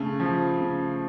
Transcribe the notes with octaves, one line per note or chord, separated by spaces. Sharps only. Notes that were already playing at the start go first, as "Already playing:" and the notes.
Already playing: C#3 A3
F3
C#3